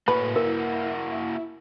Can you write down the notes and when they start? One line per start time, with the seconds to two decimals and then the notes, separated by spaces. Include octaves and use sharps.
0.08 A2 A#3 F#4 B4
0.36 E4 A#4